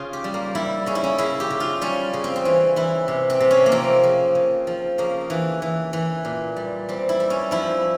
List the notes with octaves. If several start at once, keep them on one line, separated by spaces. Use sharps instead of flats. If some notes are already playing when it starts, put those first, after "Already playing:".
Already playing: C#3 F4
G4
G3
A#3
G3 E4
C#3 C#4
E4
C#4
C#3 E4
G4
C#3
F4
G3 C#4
C#3
C4
C4
E3 C#4
E3 E4
C3
C4
C3
C#4
A#3
F3 C4
C#3
C#3
F3
C#3 A#3
E3
E3
E3
A#2
G3
G3 C4
E4
G3
C#4
F3 E4